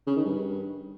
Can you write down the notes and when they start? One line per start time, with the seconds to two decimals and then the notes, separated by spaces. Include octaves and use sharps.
0.07 C#3
0.16 D#3
0.25 G2